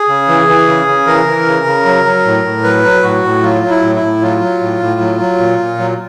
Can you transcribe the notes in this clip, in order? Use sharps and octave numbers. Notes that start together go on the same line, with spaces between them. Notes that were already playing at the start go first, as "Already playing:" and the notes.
Already playing: G#4
C#3
E3
E3
C#3
C#3
E3 A#4
E3
C#3
C#3
F#3
F#3
A2
A2
F#3 B4
F#3
A2 F#4
A2
F#3 F4
F#3
E4
A2
E4
A2
F#3 F4
F#3
A2
A2
F#3
F#3
A#2
A#2
F#3